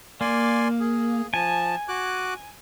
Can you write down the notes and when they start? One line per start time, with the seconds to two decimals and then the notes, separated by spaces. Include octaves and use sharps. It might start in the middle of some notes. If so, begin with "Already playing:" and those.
0.21 A#3 D5 G#5 C6
0.80 G#4
1.34 F3 G#5 A5
1.88 F#4 D6 F#6